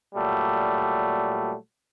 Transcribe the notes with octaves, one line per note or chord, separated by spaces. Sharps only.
A#2 F#3 G3 A3